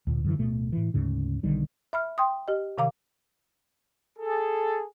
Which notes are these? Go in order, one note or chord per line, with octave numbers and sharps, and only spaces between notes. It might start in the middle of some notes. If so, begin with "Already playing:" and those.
D2 A#2
F#2 D3 E3
D1 B2 A3
A2 E3
D2 G#2 C#3
B1 D3 D#3 G3
E5 B5 F6
G5 C6 D#6
G4 D#5
C3 D#3 F5 A#5 D6
G#4 A4